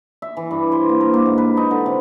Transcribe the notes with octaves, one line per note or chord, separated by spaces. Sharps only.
E5
E3
G2
C5
A#3
A#4
A#3
G#2
B4
D#4
D3
C3